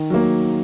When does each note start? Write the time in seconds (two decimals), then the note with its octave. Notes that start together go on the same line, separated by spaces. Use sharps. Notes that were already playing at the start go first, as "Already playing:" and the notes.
Already playing: D#3
0.10 F#3 A#3